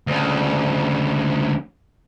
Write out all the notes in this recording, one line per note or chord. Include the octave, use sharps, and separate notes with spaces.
D2 C#3